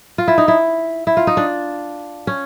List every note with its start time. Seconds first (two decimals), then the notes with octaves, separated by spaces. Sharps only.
0.18 F4
0.28 E4
0.38 D#4
0.48 E4
1.07 E4
1.17 F4
1.27 D#4
1.37 D4
2.27 C#4